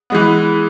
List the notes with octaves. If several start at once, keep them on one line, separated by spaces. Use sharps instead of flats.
E3 G#3 B3